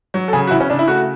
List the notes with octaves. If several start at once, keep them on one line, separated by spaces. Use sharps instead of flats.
F#3
A4
C#3 G#4
F#4
C#3 E4
C#4
C#3 D4
E4
A3 F#4